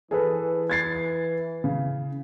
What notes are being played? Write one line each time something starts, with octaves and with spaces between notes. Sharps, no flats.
E3 G#4 A4 B4
G#6 A6 C7
C#3